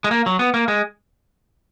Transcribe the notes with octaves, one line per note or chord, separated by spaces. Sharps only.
G#3
A#3
F#3
B3
A#3
G#3